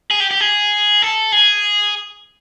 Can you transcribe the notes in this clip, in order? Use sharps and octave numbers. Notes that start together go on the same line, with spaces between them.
G#4
G4
G4
G#4
A4
G#4